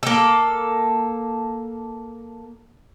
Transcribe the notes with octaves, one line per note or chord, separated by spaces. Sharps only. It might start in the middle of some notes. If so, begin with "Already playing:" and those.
A#3 A4